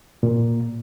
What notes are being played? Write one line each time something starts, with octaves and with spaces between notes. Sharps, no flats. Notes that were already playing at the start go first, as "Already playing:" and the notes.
A#2